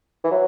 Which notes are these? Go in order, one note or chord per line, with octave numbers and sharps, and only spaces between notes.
E3
F#3